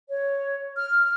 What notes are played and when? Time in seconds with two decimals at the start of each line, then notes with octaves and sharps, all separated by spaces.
0.09 C#5
0.77 F6